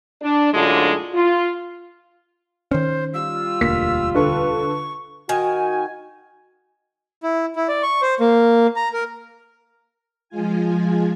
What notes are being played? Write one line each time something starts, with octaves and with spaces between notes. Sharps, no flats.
D4
F#2 A2 D3 G#3 D4 F4
F4
D#3 C#4 C5
G3 F4 E6
E1 D2 A#3 B6
D3 A4 B4 C#6
D#3 F#4 G#5
E4
E4
D5
C#6
C5
A#3
A#5
A#4
F3 G#3 F4 G#5